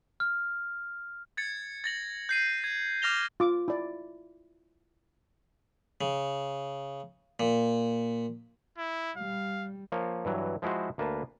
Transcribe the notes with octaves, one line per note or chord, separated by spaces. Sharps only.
F6
G#6 A6 C#7
A6 A#6 F#7
G6 C7 D#7
G#6
D6 F6 A#6 F7 G7
F4 D6
E4 D5
C#3
A#2
E4
G3 F5
F3 A#3 C#5
G2 E3 F#3
F3 G#3 E4 F#4 C5
D2 A#3 B4 A5